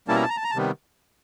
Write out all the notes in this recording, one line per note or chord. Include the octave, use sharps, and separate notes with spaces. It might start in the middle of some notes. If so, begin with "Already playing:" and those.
B2 G3 A#3 C#4 E4 A5
A#5
A5
A#5
A5
A#5
A5
C3 D#3 G3 B3